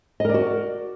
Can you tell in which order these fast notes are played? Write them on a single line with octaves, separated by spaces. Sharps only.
D#5 A#4 D5 F#4